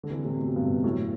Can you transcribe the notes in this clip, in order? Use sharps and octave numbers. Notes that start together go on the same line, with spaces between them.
D3
C3 E3
A2 C3
B2
C3
G2 B2
F#2 A2